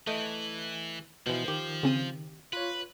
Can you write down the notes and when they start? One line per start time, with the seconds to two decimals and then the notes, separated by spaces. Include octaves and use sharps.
0.07 E3 A3 D#5 G6
1.27 B2 E3 F3
1.48 D#3 G4
1.83 C#3 C4 D#7
2.53 F4 B4 C#5